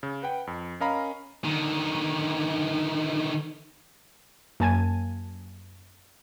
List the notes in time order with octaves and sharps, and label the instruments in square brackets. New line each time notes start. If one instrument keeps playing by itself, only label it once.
[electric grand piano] C#3
B4 F#5 G5
F2
C#4 A#4 D#5 F5 A#5 B5
[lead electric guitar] D3 D#3
[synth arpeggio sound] F#2 A#3 G#5 A5 G#6 D#7